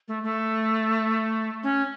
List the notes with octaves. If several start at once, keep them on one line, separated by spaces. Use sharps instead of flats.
A3
A3
C#4